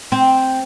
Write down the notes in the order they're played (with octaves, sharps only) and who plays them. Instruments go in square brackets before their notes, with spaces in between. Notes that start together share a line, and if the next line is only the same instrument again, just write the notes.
[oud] C4